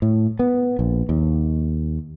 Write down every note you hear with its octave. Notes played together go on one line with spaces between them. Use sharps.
A2
B3
A#1
D#2